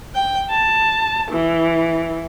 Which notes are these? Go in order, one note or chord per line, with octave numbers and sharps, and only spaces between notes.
G5
A5
E3